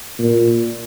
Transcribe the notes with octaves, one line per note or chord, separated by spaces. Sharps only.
A#2